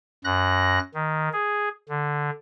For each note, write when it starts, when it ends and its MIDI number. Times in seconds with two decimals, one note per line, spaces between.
0.25 0.79 42
0.25 0.79 90
0.25 0.79 94
0.94 1.29 51
1.33 1.69 68
1.89 2.30 50